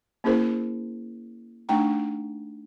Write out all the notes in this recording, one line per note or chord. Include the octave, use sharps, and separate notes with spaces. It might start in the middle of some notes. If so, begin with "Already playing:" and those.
A#3 C#4 E4 G#4 A#4 C5
A3 D4 D#4 G5 A#5